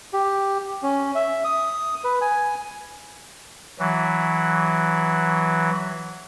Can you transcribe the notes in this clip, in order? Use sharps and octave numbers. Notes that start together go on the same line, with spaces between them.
G4
C#4
E5
D#6
B4
G#5
E3 F#3